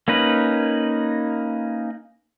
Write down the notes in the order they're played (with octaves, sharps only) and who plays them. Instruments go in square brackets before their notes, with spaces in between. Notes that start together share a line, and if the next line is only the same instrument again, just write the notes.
[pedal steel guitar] A#3 C#4 D#4 B4